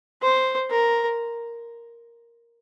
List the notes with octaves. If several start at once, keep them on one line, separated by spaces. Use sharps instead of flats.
C5
A#4